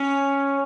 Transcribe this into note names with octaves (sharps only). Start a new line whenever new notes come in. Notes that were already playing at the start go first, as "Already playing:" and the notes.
Already playing: C#4